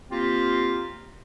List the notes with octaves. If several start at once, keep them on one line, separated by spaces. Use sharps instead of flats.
A#3 C4 F4 G4